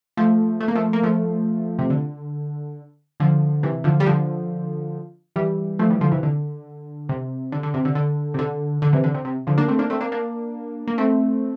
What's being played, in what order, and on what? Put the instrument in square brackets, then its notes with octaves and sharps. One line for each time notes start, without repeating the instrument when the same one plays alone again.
[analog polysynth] F3 A3
A3
A#3
F3 A3
A#3
F3 A3
C3
D3
D3 F3
C3 E3
D3 F3
G3
D3 F3
E3 G3
F3 A3
E3 G3
D3 F3
C3 E3
D3
C3
D3
D3
C3
D3
D3
C3
D3
D3
C3 E3
D3
C3
C3
D3 F3
A#3 D4
A3 C4
A#3 D4
A3 C4
A#3 D4
A#3 D4
A#3
A3 C4